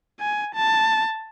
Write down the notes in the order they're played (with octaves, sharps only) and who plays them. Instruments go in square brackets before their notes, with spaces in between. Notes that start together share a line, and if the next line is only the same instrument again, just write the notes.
[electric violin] G#5
A5